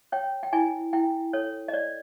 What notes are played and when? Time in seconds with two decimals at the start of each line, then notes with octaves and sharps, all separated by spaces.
0.12 C#5 G5
0.43 G5
0.53 E4 G#5
0.93 E4 G5
1.33 A4 C#5
1.68 D#5
1.73 C#5 D5